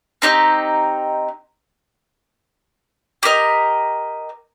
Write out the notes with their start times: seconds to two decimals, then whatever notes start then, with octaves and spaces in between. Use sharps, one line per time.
0.22 C4 D#4 G4
3.23 G4 A#4 D#5